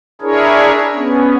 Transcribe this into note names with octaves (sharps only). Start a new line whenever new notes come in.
D4 E4 G#4 A#4 C#5
B3 C#4